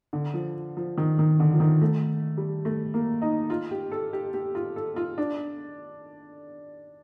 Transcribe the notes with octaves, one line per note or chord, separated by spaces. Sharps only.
D3
F3
F3
D#3
D#3
D3
F3
D#3
A3
G3
A3
A#3
D#4
F4
G4
A4
G4
G4
F4
A4
F4
D4